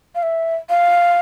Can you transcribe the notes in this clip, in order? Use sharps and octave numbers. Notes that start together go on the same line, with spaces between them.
F5
E5
F5